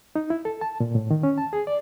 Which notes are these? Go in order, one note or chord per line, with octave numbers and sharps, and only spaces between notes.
D#4
E4
A4
A5
A#2
A2
D#3
C#4
A5
G#4
D5